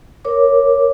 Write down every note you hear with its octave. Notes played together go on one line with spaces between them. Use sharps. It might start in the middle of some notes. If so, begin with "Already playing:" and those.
A#4 C#5 D6